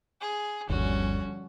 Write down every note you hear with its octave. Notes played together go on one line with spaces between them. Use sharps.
G#4
G1 D#2 D3 F3 G3 C#4 F#4